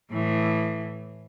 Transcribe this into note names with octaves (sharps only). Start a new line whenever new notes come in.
A2 E3